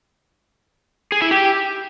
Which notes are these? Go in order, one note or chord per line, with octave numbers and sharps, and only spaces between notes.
G#4
E4
G4